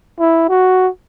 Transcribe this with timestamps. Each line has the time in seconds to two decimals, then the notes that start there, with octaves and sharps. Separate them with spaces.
0.20 E4
0.49 F#4